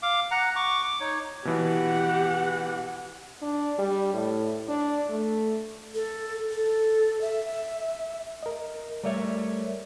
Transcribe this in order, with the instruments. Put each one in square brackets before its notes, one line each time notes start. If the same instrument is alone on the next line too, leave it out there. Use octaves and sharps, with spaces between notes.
[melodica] F5 D6
F#5 A#5
C#6 D6
D6
D#4 C#5
[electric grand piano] B2 E3 [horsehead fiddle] G4 F#5
[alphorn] D4
G3
A2
D4
A3
[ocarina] A4
A4
E5
[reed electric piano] A#4 D#5
[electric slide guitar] G3 A3 C#5 [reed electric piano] A#4 D5 E5